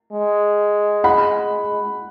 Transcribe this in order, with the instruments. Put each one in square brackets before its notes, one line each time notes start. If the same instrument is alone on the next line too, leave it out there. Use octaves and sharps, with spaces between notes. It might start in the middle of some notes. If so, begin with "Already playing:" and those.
[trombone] G#3
[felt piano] F#5 B5